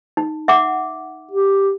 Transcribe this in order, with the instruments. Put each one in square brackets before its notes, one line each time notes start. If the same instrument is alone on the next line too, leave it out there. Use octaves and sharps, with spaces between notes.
[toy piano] D#4
E5 F#5 D6
[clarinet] G4